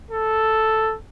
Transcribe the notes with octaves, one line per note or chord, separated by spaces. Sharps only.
A4